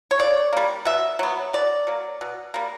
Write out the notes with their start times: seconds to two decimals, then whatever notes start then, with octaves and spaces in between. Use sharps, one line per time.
0.11 C#5
0.19 C#3 D5
0.53 G3 A#3
0.85 B2 E5
1.19 F#3 B3
1.53 B2 D5
1.87 F#3 A#3
2.21 B2
2.54 G3 A#3